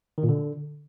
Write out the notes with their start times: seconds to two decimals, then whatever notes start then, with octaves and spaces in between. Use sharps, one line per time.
0.18 D#3
0.23 A#2
0.29 D3